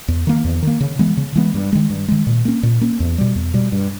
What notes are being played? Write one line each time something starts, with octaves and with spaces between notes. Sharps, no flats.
E2
D#3 A#3
E2
D#3 A#3
C#3
E3 G#3 B3
C#3
E3 G#3 B3
G2
D#3 G#3
G2
D#3 G#3
A#2
A#3 C#4
A#2
A#3 C#4
E2
B2 G3
E2
B2 G3
G2